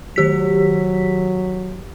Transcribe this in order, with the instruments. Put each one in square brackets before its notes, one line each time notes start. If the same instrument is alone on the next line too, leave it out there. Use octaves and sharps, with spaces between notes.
[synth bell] D#3 G4 B6 [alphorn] F#3